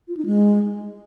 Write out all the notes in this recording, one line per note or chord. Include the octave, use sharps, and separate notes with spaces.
F4
D#4
G#3